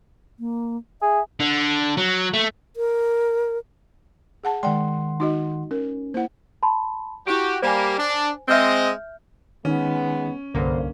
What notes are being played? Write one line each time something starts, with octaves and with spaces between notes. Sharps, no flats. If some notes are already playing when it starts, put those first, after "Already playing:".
A#3
G#4 E5
D3
F#3
A3
A#4
G#4 F#5 A5
D#3 G#3 D5 F#5 G5 C6
D#4 F#4 D#5
C#4 A#4
A#3 E4 C5 F#5
A5 B5 C6
E4 F#4 G4 D7
G3 A#3 C5 G#5
D4
G#3 C4 D#5 E5 F6 G6
D#3 G#3 B3 C#4 D#4
C2 G2 D3 A#3 C5